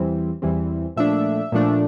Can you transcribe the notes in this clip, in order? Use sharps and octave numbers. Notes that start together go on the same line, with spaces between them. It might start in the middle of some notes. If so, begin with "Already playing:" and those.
Already playing: E2 E3 G3 C4
E2 E3 G3 C4
A#2 F3 A3 D4 E5
A#2 F3 A3 D4